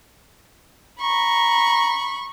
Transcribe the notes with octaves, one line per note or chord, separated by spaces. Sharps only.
A#5 B5 C#6